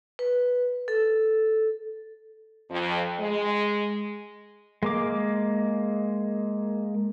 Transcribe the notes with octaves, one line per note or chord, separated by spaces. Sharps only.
B4
A4
F2
G#3
G#3 A#3 D6